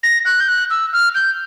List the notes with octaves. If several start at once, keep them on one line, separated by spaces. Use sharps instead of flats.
A#6
F#6
G6
F#6
E6
F6
G6